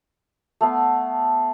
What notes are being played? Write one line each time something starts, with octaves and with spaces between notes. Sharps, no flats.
A3 B3 F5